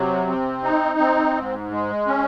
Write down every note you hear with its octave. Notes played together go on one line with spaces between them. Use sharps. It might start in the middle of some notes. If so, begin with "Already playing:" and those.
Already playing: C3 F#3
C4
D#4
C4
G#2
G#3
C#4